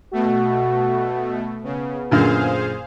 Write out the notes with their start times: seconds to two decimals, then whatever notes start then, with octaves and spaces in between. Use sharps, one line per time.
0.13 B2 A3 F#4
1.64 C#3 B3
2.11 F#2 A#2 D3 G#4 C5 F5